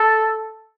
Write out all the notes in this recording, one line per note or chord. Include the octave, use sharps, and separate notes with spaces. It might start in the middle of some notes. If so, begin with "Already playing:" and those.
Already playing: A4